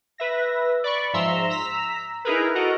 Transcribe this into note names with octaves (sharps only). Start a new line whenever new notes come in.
B4 E5 A#6
D5 B5 C#6
G#2 F3 E5 A#5 C6 E6
A#5 E6 B6
D#4 E4 G#4 A#4 B4
F#4 A4 A#4 D#5 F#5